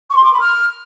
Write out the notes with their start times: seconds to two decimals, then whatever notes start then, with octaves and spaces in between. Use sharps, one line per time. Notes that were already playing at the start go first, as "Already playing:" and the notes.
0.09 C#6
0.17 C6
0.24 D6
0.32 B5
0.40 F6